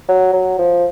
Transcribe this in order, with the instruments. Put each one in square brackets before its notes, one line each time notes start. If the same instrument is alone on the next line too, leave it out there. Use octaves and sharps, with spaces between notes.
[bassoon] F#3
F#3
F3